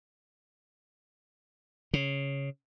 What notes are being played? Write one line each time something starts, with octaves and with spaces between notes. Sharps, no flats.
C#3